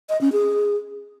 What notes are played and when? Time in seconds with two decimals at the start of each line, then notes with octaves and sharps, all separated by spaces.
0.09 D#5
0.21 C#4
0.33 G#4